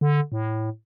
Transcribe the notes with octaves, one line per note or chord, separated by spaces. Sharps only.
D3
A2